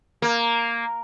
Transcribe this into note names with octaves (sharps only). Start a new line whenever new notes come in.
A#3